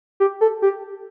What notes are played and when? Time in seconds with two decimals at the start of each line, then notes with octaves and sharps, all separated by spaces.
0.20 G4
0.41 A4
0.62 G4